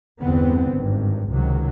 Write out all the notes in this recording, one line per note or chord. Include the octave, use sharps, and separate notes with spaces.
G1 E2 D3 B3 C4
G#1 G2
C#2 C3 D#3 F#3